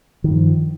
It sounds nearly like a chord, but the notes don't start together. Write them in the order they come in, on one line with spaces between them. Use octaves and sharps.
D#3 G2 F3